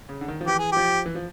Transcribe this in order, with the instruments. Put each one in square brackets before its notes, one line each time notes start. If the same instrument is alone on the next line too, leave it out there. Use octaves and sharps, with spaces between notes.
[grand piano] C#3
D3
D#3
F3
[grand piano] E3 [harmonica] G4
[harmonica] G#4
[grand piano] F3 [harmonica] G4
[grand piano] E3
F3